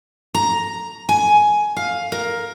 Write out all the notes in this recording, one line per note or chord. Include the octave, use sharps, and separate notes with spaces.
A#5
G#5
F5
A#4